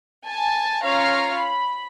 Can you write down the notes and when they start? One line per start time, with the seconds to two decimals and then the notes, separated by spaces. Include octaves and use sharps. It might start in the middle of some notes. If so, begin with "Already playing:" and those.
0.25 G#5 A5
0.84 C#4 F4 C#5 F5 A#5 F6
1.37 B5